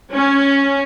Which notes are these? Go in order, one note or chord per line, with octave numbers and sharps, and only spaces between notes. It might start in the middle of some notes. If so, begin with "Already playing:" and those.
C#4